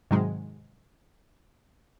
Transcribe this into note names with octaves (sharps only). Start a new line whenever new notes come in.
G#2 C3 D#3 F#3 G#3